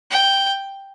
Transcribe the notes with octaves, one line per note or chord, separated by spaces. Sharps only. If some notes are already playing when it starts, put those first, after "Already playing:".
G5